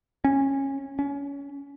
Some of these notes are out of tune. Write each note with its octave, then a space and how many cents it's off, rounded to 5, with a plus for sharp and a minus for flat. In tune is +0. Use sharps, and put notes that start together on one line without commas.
C#4 -20
C#4 +25